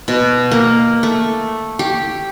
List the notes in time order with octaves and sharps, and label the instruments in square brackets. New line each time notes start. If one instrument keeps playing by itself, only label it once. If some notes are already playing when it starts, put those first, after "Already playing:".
[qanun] B2
A#3
A3
G4